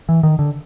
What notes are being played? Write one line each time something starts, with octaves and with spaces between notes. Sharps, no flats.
E3
D#3
D3